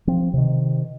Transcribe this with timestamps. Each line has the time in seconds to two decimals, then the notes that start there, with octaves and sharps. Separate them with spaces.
0.07 F3 C4
0.34 C3 D#3